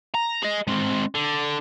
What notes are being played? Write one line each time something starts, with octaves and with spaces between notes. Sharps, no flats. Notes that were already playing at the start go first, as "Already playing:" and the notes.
A#5
G#4 D#5
G#3 C4
D3